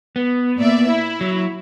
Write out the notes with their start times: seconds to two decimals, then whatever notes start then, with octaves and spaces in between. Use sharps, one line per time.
0.16 B3
0.57 A#2 D5 E5
0.90 E4
1.21 F#3